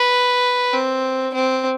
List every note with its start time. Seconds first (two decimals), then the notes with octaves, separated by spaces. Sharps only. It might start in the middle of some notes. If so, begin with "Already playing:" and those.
Already playing: B4
0.73 C4
1.34 C4